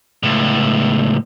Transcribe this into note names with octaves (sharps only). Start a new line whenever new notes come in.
C#2 A2